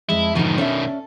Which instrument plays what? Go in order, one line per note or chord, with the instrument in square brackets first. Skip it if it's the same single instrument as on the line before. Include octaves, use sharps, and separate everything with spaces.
[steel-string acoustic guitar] F2 G#3 A5 [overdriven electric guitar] E4
[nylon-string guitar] E2 D#4 [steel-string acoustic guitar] G#2 D3 F3 [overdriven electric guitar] B2 D#3
[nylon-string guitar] C#4 D4 E5 [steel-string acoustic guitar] A4